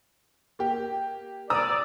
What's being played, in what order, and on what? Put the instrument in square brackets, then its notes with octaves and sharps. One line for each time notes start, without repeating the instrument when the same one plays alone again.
[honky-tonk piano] A#3 G4
[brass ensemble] D5 [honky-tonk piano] A#5 D#6 E6